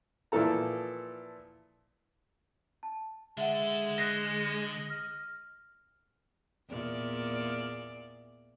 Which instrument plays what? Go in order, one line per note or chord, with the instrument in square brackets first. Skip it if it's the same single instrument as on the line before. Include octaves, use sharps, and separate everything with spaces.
[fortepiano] A#2 E3 F3 E4 A4 A#5
[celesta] A5
[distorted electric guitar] D3 A4 [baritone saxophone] G#3 [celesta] E5 F#5
[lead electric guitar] D#5 [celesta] F#6 B6 C7
[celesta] F6
[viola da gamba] E2 A#2 D5